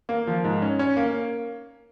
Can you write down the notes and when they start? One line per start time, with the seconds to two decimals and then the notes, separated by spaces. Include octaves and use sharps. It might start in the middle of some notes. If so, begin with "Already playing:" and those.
0.09 A#3
0.27 F3
0.44 G#2
0.62 C#4
0.79 C#4
0.97 A#3